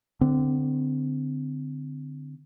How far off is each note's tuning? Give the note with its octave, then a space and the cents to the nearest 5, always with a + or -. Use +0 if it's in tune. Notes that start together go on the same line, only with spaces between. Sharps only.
D3 +0 C4 -25